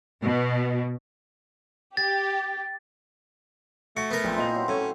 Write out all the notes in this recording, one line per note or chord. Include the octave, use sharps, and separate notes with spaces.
B2
G4 A6
A3 F#4 C#7
B3 A#4
A#1 C4 C5 G#5
A#2 E3 F4 D#5 A#5 F7
E3 F#3
A2 C#4 C#5